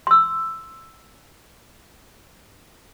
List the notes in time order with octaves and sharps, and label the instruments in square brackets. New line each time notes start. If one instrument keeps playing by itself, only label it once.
[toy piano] C6 E6